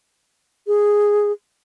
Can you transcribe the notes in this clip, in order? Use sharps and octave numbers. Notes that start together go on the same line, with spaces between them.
G#4